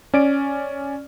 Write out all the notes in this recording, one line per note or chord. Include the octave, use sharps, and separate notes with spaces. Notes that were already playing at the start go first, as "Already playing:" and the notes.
C#4 D5 D7